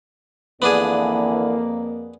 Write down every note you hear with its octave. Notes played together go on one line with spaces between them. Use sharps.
F2 D3 E3 A#3 B3 D4 G#4